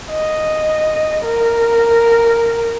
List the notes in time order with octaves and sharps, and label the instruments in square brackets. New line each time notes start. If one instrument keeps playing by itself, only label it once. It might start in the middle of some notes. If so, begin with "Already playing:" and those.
[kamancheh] D#5
A#4